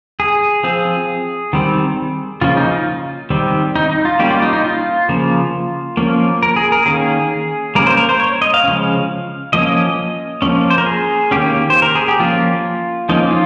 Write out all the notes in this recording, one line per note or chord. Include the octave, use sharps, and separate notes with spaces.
G#4
F3 C4 G#4
D#3 G3 C4
C#3 F3 A#3 C#4 F4
D#4
F4
D#3 G3 C4
D#4
D#4
F4
G3 A#3 C#4 G4
F4
D#4
D#4
F4
C#3 F3 A#3
F3 A#3 C#4
A#4
G#4
A#4
D#3 A#3 C#4 G#4
G3 A#3 C#4 A#4
C5
A#4
C5
C#5
D#5
F5
C#3 F3 G#3 C#4
F3 A#3 C#4 D#5
F3 A#3 C#4
C5
A#4
G#4
D#3 A#3 C#4 G4
C5
A#4
G#4
G4
F3 A#3 C#4 F4
F3 A#3 C#4 D#4
F4